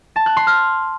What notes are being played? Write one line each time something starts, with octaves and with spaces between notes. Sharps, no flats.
A5
F#6
C6
F6